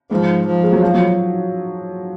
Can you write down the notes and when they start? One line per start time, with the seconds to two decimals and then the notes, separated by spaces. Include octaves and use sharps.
0.10 G#2 F3
0.46 F3
0.63 G#3
0.72 F#3
0.82 F3
0.94 F#3